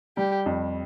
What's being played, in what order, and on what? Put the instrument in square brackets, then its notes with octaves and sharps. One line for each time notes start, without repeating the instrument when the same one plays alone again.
[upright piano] G3 [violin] G4
[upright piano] F2